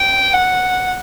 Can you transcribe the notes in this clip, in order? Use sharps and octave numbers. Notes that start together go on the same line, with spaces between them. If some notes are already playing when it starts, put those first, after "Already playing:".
Already playing: G5
F#5